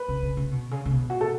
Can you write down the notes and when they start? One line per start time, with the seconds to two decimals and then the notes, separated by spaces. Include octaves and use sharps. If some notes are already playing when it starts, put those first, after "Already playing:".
Already playing: B4
0.08 C#3
0.22 C#3
0.37 C#3
0.51 B2
0.71 C#3
0.86 C#3
0.91 B2
1.09 A2 F#4
1.21 A4